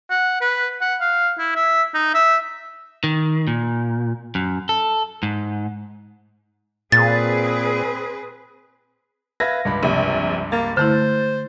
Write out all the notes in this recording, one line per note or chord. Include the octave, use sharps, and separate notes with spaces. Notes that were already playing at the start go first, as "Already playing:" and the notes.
F#5
B4
F#5
F5
E4
E5
D#4
E5
D#3
A#2
F#2
A4
G#2
A#2 C4 G#4 B4 A6
B4 E5 F5 G#6 A#6
C#2 G2 B5
A#1 C3
A#3 A6
D3 A3 E4 C5